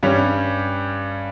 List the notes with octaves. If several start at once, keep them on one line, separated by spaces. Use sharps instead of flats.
G2 G3 C#4